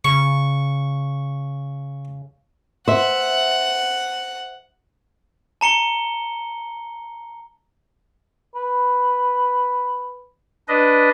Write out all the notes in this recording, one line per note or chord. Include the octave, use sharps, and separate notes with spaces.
C#3 C#6
C5 E5 F#5
A5 A#5 C#7 G7
B4
D4 B4 D#5